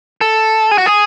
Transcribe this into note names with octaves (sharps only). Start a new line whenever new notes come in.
A4
G#4
F#4
G#4